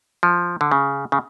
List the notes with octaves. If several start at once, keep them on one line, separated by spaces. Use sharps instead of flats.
F3
D3
C#3
C#3